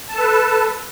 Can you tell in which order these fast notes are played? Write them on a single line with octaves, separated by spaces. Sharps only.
A5 A4 B4